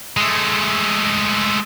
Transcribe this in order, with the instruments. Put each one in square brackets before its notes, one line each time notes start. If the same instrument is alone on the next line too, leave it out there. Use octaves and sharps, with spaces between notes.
[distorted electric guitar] G#3 A3